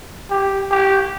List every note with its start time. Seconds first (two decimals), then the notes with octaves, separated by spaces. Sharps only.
0.30 G4
0.71 G4